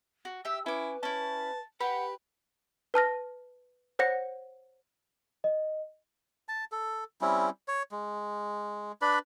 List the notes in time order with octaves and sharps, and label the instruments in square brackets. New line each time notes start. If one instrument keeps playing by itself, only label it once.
[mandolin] F#4
[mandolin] G4 E5 [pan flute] E6
[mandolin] C#4 D6 [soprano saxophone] E4 [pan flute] B4
[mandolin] C#4 E4 [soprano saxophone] A5
[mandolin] G4 [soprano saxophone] B4 [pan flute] F#5
[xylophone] B4 A5 F6 A#6
C5 C#5 F#5 A#6 C#7
[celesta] D#5
[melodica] A5
A4
G3 C4 C#4 E4
C#5
G#3
D4 B4 D5 B5